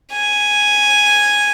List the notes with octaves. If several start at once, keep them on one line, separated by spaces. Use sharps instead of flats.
G#5